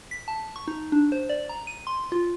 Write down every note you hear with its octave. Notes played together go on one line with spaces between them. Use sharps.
B6
A5
C#6
D#4
D4
C5
D5
A#5
D#7
C6
F4